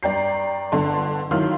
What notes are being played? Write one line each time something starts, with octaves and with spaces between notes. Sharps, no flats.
G2 D5 G5 A#5 G6 C7
G1 D3 A5 C6
D#3 F#3 E4 F5 C6 F6